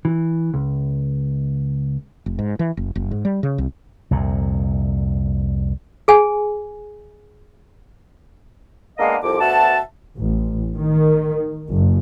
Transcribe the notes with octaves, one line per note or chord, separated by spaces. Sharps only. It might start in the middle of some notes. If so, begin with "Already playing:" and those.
E3
C#2
F1
G#2
E3
F#1
F#1
G#2
G3
C#3
C2
C2 F2 A#2
G#4 G#5
G#3 A#3 B3 D4 D#5 F5
C2 F2 D6
D2 B2 E5 F#5 A5
A1
D#3
F#1